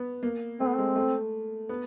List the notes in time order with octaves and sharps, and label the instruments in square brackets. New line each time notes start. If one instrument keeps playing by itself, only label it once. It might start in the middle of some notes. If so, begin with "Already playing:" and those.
Already playing: [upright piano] B3
A#3
[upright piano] A3 [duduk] C4
[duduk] B3
[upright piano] G#3 [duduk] C4
[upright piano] A3
B3